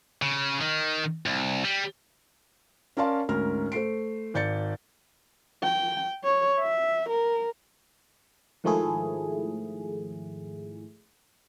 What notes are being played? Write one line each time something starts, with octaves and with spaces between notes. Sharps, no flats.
C#3
D#3
C2
G3
C#4 A#4 D5 F5 A5 C6
D2 G#2 C#4 A#4 F6
A3 C5 C7 D7
G#1 D5 G6 A6 C#7
G5
C#5
E5
A#4
G#2 D#3 F3 A3 E4 G#4